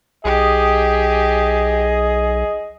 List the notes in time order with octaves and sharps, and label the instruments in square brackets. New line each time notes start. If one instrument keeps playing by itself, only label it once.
[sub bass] B1 [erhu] G4 [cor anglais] G#4 [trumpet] D#5